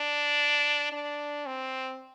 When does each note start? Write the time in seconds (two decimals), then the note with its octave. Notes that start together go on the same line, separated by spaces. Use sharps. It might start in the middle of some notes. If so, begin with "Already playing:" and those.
Already playing: D4
0.92 D4
1.46 C4